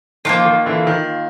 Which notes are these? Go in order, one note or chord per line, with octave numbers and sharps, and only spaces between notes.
D#3 F3 A#3 D4 F4
D#3
D3 E3
D#3